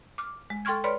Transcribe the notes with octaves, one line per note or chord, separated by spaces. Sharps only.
D6 F6
G#3
A4 G5 C6 C#6 F6 G#6
B4 C#5 D5 B5 C6 F6